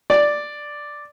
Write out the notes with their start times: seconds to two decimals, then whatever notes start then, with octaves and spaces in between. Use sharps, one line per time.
0.10 D5